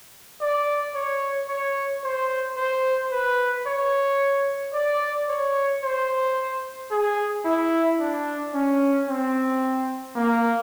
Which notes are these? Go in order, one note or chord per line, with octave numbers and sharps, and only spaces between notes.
D5
C#5
C#5
C5
C5
B4
C#5
D5
C#5
C5
G#4
E4
D4
C#4
C4
A#3